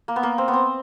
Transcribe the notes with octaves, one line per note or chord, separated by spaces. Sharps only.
A#3
B3
A#3
C4
B3
C4